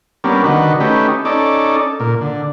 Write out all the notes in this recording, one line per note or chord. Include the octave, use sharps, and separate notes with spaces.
G3 A#3 B3 C#4 D4
D3 D#3 F#4 B4
A3 C#4 D#4 G4 B4
C#4 D#4 A4 D5
A#2
D3